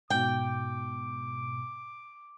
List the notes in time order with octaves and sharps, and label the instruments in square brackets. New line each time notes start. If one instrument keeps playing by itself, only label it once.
[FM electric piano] G#2 B2 [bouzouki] G5 [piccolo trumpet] D6